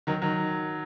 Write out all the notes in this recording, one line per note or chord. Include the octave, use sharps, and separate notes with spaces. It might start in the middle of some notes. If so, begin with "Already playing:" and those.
D#3 F#3
D#3 F#3